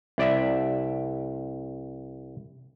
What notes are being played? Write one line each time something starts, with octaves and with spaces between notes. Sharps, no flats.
C2 D5 E5